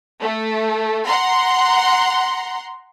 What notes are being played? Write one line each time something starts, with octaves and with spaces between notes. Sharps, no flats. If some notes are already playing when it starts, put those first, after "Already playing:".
A3
F#5 A#5 C6